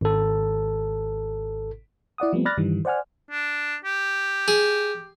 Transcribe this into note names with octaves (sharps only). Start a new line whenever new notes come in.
G#1 A4
E4 D5 F#5 D#6
F3 G3 A3 B3 C4
D5 B5 F6 F#6 A6 A#6
G2 D#3 E3 G3
C5 D5 F#5 G#5 F6
D4
G4
G#4